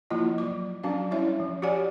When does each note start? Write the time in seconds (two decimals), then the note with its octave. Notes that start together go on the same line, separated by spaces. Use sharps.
0.10 F3 A#3 E4 F4 D#5
0.38 F#3 D6
0.83 F#3 C#4 D4 F#4 F5
1.11 G3 C#4 E4 C#5 E5
1.40 F3
1.62 F#4 G4 C#5 D5 F#5 G#5